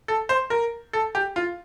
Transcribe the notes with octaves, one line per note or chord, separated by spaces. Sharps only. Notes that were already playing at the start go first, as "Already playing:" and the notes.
A4
C5
A#4
A4
G4
F4